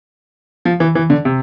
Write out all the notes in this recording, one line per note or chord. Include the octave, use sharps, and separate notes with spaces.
F3
E3
E3
D3
C3